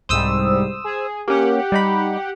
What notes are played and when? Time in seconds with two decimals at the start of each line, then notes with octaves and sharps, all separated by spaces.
0.09 C2 G#2 G3 C5 D#6 E6
0.84 G#4
1.28 A#3 C#4 G4 F#5
1.72 G3 D#4 B5